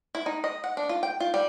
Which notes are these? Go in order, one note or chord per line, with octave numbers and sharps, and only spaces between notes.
E4
D#4
D#5
F#5
D4
F4
G5
F4
G3